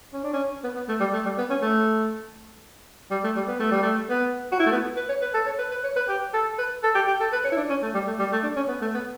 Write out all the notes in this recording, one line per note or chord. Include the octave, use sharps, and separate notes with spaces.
C#4
D4
C#4
B3
B3
A3
G3
A3
G3
B3
C#4
A3
G3
A3
G3
B3
A3
G3
A3
B3
F#4
E4
A3
B3
B4
C#5
B4
A4
C#5
B4
B4
C#5
B4
G4
A4
B4
A4
G4
G4
A4
B4
C#5
E4
D4
C#4
A3
G3
A3
G3
A3
D4
C#4
B3
A3
B3